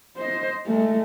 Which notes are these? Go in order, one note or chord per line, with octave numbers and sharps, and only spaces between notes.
C5 D#5
G#3 A3